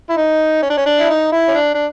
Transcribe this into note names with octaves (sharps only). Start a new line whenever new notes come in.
E4
D#4
C#4
D4
C#4
D4
E4
D#4
E4
C#4
D4
D4